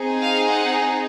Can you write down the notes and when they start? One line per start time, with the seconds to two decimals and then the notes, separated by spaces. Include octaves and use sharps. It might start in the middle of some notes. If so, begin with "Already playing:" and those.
Already playing: C4 D#4 G#4
0.21 F5
0.50 F#5